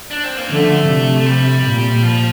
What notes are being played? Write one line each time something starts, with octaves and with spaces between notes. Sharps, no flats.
D4
C4
A#3
D3 F3 A3
C3
A3
G3
A#2
F3